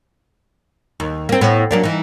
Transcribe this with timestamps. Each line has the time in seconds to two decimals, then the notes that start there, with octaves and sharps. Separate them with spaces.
1.00 D#2
1.29 A#3 C4
1.41 A2 B3
1.71 F#3 A#3 D4
1.83 E3 D#4